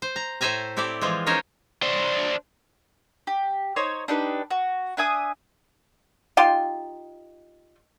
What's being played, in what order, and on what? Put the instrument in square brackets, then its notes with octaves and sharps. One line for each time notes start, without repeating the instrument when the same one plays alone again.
[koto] C5
A#5
A2 A4 C5 E5 G#5 A#5
C4 E4 G4 A4 D5
E3 F3 G#3 F4
C#4 D#4 A#4 C5 C#5
[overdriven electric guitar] D4 C5
[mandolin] G4
D#4 C5 C#5
D4 D#4 G4 B4
F#4
D4 E5 G#5 D#6
[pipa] D#4 F4 G4 C6